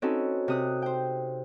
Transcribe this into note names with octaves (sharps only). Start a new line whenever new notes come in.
C4 C#4 D#4 F#4 A4 B4
C3 D#6 F#6
C5 G5